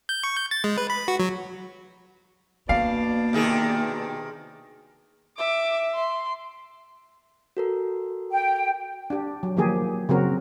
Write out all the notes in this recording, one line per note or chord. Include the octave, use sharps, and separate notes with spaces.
G6
C#6
G6
A6
G#3
B4
B5
F#4
F#3
B2 A#3 D4 D5 F5
C3 D#3 G#4
E5 D6
C6
F#4 A4 A#4
G5
D4 G4
F#3
D#3 F3 F#3 A#3 G4 G#4
C#3 F#3 C4 F#4 A#4